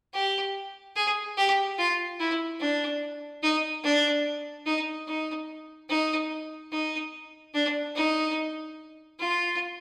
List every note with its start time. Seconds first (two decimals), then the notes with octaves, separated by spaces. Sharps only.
0.14 G4
0.96 G#4
1.38 G4
1.78 F4
2.20 E4
2.60 D4
3.43 D#4
3.84 D4
4.66 D#4
5.07 D#4
5.90 D#4
6.72 D#4
7.54 D4
7.95 D#4
9.19 F4